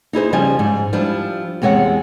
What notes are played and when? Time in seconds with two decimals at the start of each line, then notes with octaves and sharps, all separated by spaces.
0.13 D#4 E4 G#4 C5
0.33 C#3 F3 G3 D#5 G#5
0.59 G#2
0.93 F3 G3 D4 E4
1.62 E2 C3 G#3 C#5 F#5